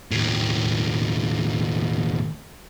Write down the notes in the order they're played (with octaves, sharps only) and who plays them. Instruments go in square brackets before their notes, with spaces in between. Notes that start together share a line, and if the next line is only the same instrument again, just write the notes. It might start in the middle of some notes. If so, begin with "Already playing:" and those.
[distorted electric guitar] D#2 A2